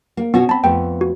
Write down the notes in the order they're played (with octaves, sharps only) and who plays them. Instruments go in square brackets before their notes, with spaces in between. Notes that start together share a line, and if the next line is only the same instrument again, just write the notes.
[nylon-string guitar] A#3
[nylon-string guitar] B2 C#4 F#4 [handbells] B3
[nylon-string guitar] C4 [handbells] A5 B5
[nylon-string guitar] F2 A3 B3 [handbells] G5
[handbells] F#4